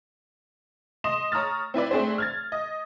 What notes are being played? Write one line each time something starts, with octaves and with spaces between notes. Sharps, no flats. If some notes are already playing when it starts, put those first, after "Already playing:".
D#5 C6 D#6 E7
C#5 A#5 D#6 F6 A6
C4 E4 B4 D5
A3 C4 D4 G#4 C5
F6 G#6 A6
D#5